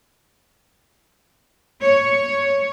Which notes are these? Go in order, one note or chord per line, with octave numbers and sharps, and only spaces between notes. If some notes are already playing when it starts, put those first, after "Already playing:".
C#5